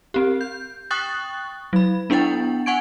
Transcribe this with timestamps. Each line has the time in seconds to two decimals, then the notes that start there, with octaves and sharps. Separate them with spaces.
0.14 C4 G4
0.41 G6
0.90 G5 C#6 D#6 F#6 A6
1.73 F#3 B5
2.10 B3 D4 E4 F#5 G5 A6
2.66 F#5 G#5 C#6 G#6 D7